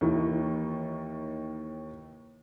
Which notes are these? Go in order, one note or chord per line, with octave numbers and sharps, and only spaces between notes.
D#2 D#3 E3